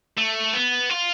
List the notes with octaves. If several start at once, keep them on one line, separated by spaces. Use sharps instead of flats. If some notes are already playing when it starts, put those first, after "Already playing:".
A3
B3
F4